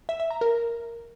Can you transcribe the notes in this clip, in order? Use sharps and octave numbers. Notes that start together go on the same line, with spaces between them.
E5
E5
A#5
A#4